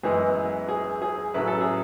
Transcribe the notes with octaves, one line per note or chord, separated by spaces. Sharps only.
F#2 E3 G#3 B3 G#4
G#4
G#4
A1 A2 F#3 C#4 E4 B4
A4
G#4